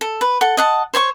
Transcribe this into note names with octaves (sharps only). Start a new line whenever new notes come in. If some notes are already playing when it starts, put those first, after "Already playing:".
A4
B4
A4 F#5
D#5 F#5 A5
C5 C#5 E5 C#6